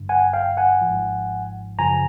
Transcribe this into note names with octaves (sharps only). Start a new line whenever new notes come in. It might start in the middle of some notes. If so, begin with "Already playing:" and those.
Already playing: G#1 G2 D3
F#5 G#5
F5 G5
F#5 G#5
G#1 G#2 F3
F#2 C#3 F3 G#5 A#5